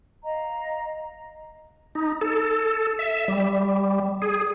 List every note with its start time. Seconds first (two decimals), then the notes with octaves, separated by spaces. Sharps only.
0.24 D#5 F5 A#5
1.95 D#4
2.21 A4
2.99 E5
3.28 G3
4.22 G#4